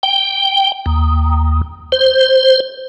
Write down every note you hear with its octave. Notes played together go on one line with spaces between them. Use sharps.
G5
D#2
C5